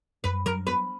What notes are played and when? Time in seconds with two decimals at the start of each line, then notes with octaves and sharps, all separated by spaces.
0.24 F#2 B4
0.46 F#3 A#4
0.67 B3 B4